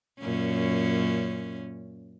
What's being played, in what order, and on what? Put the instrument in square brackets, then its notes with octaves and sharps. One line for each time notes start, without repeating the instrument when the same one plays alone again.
[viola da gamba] F#2 A#2 C#4